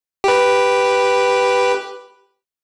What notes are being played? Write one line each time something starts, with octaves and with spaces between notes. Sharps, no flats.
G4 B4